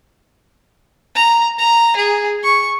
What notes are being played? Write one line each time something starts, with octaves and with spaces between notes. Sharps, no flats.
A#5
A#5
G#4
C#6